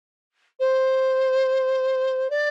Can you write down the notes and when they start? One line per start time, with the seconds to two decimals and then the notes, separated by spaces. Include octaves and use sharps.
0.60 C5
2.30 D5